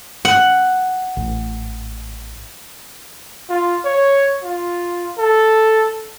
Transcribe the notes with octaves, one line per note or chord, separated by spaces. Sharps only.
F#5
A1
F4
C#5
F4
A4